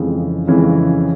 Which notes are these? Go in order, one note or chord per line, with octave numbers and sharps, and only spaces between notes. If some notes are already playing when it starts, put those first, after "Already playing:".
Already playing: F2 C#3 E3 G#3
F2 C#3 E3 G#3